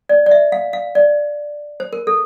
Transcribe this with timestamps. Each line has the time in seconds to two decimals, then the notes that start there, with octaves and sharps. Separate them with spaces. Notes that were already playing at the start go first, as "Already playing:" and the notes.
0.09 D5
0.26 D5
0.31 E5
0.52 F5
0.73 F5
0.95 D5
1.80 C5
1.93 A#4
2.07 A4